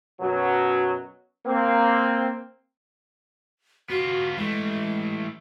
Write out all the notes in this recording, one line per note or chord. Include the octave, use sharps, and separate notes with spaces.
F#2 B2 F#3
A#3 C4
B3 F4 F#4
E3 G#3 A3